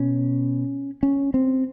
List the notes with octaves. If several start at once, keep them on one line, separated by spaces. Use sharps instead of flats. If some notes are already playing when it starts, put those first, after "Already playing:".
Already playing: B2 C#4
C#4
C4